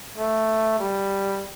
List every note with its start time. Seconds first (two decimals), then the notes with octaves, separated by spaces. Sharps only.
0.18 A3
0.79 G3